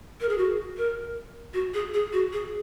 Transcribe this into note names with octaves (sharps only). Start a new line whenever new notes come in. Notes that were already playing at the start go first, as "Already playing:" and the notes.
A#4
G#4
F#4
A#4
F#4
G#4
G#4
F#4
G#4